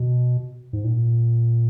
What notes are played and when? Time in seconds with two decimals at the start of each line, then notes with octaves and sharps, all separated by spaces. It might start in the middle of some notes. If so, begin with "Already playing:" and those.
Already playing: B2
0.73 G#2
0.84 A#2